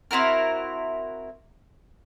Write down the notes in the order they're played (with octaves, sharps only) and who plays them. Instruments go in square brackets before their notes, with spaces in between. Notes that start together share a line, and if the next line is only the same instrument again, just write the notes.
[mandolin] C4 E4 F#4 A#4